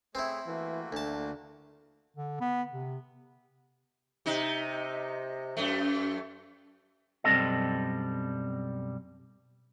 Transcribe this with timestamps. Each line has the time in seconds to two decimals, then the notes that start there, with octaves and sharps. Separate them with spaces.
0.15 A3 C4 E4 G#4 C#5
0.47 E3 A3 A#3 F#4
0.92 D2 D3 A5
2.17 D3
2.41 B3
2.71 C3
4.26 C3 D#4
5.57 F#2 A3
7.24 B1 F#2 G3 C4 A4 D#5